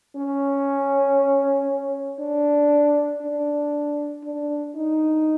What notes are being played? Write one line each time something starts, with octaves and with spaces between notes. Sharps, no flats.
C#4
D4
D4
D4
D#4